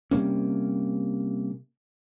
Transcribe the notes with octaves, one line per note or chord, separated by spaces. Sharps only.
C3 G3 A#3 C#4